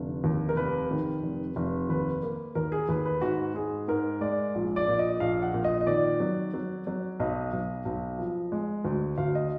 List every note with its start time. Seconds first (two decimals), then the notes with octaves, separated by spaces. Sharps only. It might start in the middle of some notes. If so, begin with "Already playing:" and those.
Already playing: F1 D3
0.24 D#2
0.49 A#4
0.57 F1 B4
0.91 D#3
1.23 F1
1.56 F1
1.89 D#2 B4
2.23 A#3
2.55 D#2 A#4
2.72 G#4
2.89 D#2 B4
3.06 B4
3.21 G#2 F#4
3.55 G#2 G#4
3.88 G#2 A#4
4.21 G#3 D5
4.55 A#1
4.76 D5
4.88 A#2
4.99 D#5
5.20 A#1 F5
5.42 F#5
5.54 A#2
5.64 D#5
5.81 D#5
5.87 D#3 D5
6.20 F#3
6.54 F#3
6.87 F#3
7.20 B1 D#5
7.53 B1
7.85 B1
8.19 F3
8.52 G#3
8.85 D2
9.18 D2 F5
9.35 D#5